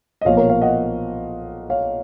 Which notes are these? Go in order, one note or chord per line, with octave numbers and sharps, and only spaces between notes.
D#5
B1 A#2 F3 C#5 F5
A#4 C#5
C#5 F5
D#5 F#5
C#5 F5